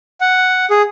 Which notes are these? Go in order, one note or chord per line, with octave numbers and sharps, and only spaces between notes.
F#5
G#4